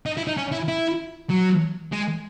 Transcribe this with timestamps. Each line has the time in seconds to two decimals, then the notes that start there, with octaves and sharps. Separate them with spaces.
0.06 D#4
0.17 E4
0.27 D#4
0.37 C#4
0.52 E4
0.68 E4
1.30 F#3
1.92 G#3